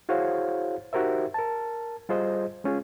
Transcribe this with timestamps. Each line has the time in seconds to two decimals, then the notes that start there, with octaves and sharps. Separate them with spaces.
0.09 E4 F#4 G#4 C5 C#5 F5
0.93 D#4 F#4 G4 A#4 C5 E5
1.34 A#4 A5
2.09 G3 F4 G#4 C5 D#5
2.64 G#3 C#4 F4 G#4